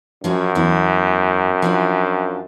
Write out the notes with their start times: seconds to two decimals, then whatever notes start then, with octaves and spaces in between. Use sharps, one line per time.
0.24 F#2 F3 C#4 F#4
0.55 E2 F#3 E4
1.62 F3 D4 F4